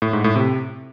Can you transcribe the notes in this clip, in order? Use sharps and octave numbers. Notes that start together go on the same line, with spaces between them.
A2
G#2
A2
C3